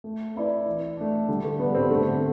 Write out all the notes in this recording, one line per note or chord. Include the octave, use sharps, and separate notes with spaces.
A3
C4 E4 B4 D5
E3
A3 D4
D3 G3
A3
G3 B3 D4
C4
D3 A3